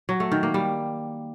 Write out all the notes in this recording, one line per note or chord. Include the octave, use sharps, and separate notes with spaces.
F#3
A3
D#3
A#3
G3